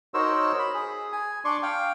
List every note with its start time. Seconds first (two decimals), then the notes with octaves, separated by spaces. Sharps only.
0.14 D#4 F#4 A#4 C5 C#5 E6
0.59 B5
0.74 G#4
1.12 G#5
1.45 D4 D5 C6 C#6
1.63 F5 G5